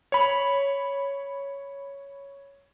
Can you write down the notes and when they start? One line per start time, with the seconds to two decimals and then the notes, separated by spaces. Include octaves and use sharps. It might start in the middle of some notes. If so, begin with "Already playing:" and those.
0.12 C#5 B5